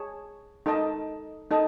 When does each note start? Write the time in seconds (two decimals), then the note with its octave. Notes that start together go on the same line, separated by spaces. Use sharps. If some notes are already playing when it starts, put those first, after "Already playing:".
Already playing: G#4 C#5 A5
0.66 D#4 A4 D#5 A5
1.51 D#4 A4 D#5 A5